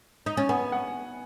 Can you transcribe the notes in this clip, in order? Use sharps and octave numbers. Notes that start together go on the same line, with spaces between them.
D#4
C#4
B3 G#5
F#5